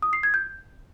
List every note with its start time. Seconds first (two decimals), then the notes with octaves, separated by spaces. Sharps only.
0.02 D#6
0.13 C7
0.23 G#6
0.34 G6